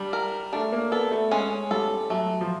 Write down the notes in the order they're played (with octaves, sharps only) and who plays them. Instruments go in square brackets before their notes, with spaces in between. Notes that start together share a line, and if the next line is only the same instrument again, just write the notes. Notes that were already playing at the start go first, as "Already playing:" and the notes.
Already playing: [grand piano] G3 [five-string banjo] D4
[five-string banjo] A#4
[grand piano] A3 [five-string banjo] D4
[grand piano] A#3
[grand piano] B3 [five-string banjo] A4
[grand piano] A3
[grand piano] G#3 [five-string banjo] C#4
[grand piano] G3 [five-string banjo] A4
[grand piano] F#3 [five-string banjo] A3
[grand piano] F3